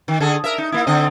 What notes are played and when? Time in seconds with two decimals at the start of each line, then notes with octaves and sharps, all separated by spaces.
0.08 D#3
0.20 D3 G#4 A4
0.44 A#4 E5
0.58 D#4
0.72 A#3 E4
0.87 D3 C4 D#5